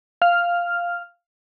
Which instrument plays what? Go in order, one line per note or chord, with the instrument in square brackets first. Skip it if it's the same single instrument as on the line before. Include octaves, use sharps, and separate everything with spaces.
[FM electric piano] F5 F6